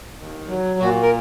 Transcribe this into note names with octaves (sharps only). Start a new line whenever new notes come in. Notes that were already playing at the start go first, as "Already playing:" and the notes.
D#2
F#3
A#2 F#4
A#4